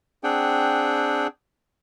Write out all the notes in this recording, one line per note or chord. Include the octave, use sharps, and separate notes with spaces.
C4 D4 G#4 F#5 G5